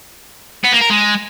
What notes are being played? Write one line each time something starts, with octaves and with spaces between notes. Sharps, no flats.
B3
A#3
A#4
G#3